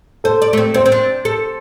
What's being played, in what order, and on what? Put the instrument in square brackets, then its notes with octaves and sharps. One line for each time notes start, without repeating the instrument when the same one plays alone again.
[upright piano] A4 [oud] C5
[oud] D5
A3
C4
[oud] C4 [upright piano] C5
[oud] C4
D4
A4